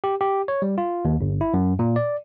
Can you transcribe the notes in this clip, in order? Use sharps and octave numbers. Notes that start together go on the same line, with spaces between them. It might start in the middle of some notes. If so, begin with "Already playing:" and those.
G4
G4
C#5
G3
F4
D#2
G1
E4
F#2
A#2
D5